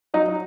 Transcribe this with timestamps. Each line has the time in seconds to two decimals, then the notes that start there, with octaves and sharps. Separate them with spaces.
0.14 F#3 D#4
0.28 D#4